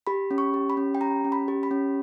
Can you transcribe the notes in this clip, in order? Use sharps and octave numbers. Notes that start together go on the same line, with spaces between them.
G4 B5
C#4
C#6
G4
B5
C#4
G5
G4 A#5
C#4
B5
G4
B5
C#4